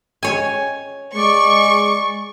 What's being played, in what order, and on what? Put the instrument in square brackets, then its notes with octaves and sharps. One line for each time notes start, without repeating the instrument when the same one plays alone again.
[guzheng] C#5 G#5
[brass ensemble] G#3 [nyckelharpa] D5 [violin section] C#6